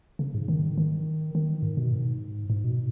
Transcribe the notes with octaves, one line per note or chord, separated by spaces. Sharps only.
C#3
G#2
D#3
D#3
D#3
G#2
B2
G#2
G#2
B2